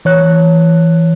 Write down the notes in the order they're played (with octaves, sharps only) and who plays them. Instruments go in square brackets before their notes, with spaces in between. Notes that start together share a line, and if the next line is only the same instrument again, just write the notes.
[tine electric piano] E3 C#5 F#6